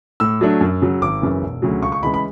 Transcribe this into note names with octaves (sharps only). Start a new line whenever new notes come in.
A2 E6
F#3 A3 D4
F#2
C#3 F#3
G#1 D6
F#2 C#3 E3
E1
D2 C#3 F#3
C#2 C#6
C#6
C#3 E3 G#3 B5
B5